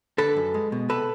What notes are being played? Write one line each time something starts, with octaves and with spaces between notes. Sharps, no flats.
D3 A4 B4
F#2
G#3
B2
C3 A4 B4